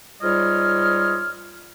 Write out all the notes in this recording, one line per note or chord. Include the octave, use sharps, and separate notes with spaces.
G#2 G3 F4 C#5 D#5 F6